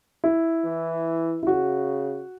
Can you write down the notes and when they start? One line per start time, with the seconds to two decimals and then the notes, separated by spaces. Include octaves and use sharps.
0.24 E4
0.65 E3
1.43 E4
1.47 C#3 F#4